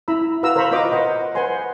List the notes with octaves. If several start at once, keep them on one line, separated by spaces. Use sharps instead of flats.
E4 A#5 B5 E6
F#4 B4 F5 A#5 E6
A#4 C5 F5 A#5 B5 C#6
F4 A#4 C5 D#5 D6
B4 C5 D#5 F#5
B4 C5 F#5 G#5 C6